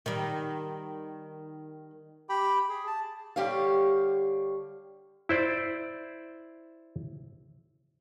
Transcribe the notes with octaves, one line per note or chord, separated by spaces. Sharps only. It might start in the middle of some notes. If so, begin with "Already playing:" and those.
D#3 G3
G4 G5 B5
G#4
A5
D3 G3 G4 C#5 F5
E4 C5 D5